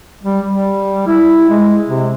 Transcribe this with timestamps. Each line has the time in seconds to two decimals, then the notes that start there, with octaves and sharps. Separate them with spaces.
0.24 G3
0.50 G3
1.07 E4
1.50 G#3
1.88 C3